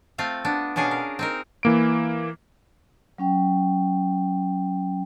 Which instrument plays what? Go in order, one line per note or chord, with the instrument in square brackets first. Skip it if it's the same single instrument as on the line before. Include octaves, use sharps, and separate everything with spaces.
[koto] A3 C4 F4 F5
B3 D4
B2 C#4 D4 G#4 F5
A#4
C4 D#4 A#4
[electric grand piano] E3 A#3 D7
[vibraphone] F#3 C#4 G5